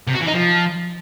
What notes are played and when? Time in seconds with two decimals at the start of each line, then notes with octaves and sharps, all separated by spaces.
0.07 C3
0.14 F#4
0.20 E3
0.27 D#4
0.33 F3